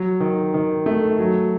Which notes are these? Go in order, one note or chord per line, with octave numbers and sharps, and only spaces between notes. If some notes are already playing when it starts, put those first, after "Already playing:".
Already playing: F#3
D#3
D#3
A3
F#3